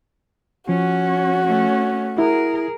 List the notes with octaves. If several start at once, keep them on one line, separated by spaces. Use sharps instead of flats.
F3 C#4 F#4
A3 C#4
E4 G#4 A#4